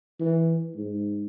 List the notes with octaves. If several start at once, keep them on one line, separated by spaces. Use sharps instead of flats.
E3
G#2